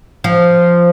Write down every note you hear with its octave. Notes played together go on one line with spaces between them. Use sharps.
F3